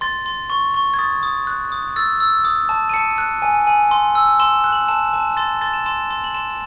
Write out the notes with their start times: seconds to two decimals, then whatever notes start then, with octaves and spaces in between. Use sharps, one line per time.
0.01 C6 A6
0.26 C6
0.50 C#6
0.74 C#6
0.94 G#6
0.99 D#6 A6
1.23 D#6
1.47 F#6
1.72 D#6
1.96 E6 A6
2.20 E6
2.45 D#6
2.69 A5
2.89 D#7
2.94 A5 C#7
3.18 F#6
3.42 G#5
3.67 G#5
3.91 C6
4.15 E6
4.40 C6 E7
4.64 F#6
4.73 F#7
4.88 A5 E7
5.13 A5
5.37 C6 A6
5.61 C6 A6
5.74 E7
5.86 C6 E7
6.11 C6
6.24 F#7
6.34 C6 E7